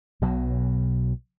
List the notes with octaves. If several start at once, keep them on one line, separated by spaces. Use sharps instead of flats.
B1 B2 F#3